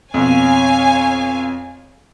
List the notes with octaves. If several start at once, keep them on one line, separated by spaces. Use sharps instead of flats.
F2 B2 C#5 F5 G#5